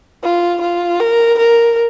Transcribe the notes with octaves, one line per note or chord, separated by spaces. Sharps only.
F4
F4
A#4
A#4